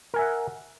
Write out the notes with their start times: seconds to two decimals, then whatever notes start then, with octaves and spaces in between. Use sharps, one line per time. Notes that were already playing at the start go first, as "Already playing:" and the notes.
0.14 A#4
0.16 G#5
0.19 E5
0.21 F#5